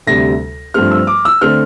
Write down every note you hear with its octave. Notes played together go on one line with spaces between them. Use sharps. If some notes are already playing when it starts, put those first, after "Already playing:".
D2 C3 G3 A#6
G2 F3 A3 C4 F6
E6
D6
E6
D3 A3 C4 F6